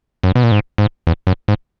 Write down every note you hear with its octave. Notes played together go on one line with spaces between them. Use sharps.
F#2
B2
A#2
G#2
G#2
E2
F#2
G#2